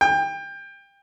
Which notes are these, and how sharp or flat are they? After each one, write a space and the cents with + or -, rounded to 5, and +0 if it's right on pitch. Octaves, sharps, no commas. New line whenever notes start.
G5 +25